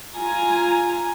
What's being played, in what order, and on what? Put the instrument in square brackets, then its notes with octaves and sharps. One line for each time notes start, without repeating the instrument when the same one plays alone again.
[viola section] F4 G#5 A#5